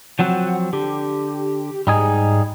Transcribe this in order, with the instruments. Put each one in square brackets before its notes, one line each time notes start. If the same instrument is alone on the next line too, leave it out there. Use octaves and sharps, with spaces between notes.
[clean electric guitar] F3 F#3 C4 [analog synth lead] F#5
[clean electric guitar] D3 [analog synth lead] G4
[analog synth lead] G#2 [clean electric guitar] G3 D#4 G#4